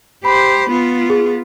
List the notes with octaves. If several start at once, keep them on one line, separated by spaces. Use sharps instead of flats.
G4 C5 B5
B3 F4
G#4